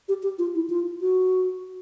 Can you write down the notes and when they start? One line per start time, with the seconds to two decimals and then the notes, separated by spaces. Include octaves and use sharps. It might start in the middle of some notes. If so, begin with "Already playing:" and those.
0.08 G4
0.23 G4
0.38 F4
0.55 E4
0.70 F4
1.01 F#4